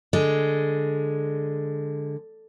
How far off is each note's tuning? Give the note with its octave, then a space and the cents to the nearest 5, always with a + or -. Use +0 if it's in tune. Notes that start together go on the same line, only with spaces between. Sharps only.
D3 +0 G#3 +0